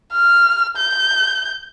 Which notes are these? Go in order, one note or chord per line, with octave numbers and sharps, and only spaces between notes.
F6
G6